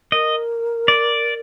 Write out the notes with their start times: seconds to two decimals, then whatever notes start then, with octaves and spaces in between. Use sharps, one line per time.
0.12 A#4 D#5
0.88 D5